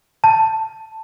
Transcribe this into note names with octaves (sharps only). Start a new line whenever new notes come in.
A5